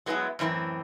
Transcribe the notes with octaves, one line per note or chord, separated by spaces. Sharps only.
F#3 G#3 B3 E4 G#4
F#2 A2 E3 C4